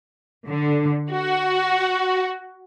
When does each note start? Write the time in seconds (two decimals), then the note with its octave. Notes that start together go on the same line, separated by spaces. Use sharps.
0.48 D3
1.12 F#4